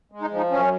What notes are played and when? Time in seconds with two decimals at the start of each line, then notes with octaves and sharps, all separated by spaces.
0.12 G#3
0.21 D#4
0.31 F3
0.37 D#4
0.51 F#2 C#4